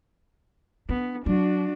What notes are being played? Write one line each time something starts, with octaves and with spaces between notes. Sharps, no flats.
B3 D4
F#3 D4 F#4